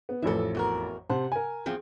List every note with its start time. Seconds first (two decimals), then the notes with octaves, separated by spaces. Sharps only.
0.09 B3
0.22 A1 F2 E3 A4 E5
0.55 E2 F#4 A#4
1.10 C3 C5 F#5 A5
1.32 A#4 G#5
1.66 E2 F3 C4 G#4